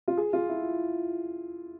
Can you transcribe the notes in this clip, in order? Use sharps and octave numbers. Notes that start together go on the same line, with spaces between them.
F4
G#4
F4
E4